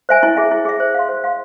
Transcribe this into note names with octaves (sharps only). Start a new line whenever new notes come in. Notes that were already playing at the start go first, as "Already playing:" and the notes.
C5 E5 G#5
E4
G#4 E5
E4
G#4 E5
C5
F5 C6
C5
F5 C6